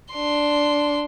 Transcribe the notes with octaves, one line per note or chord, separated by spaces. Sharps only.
D4 C6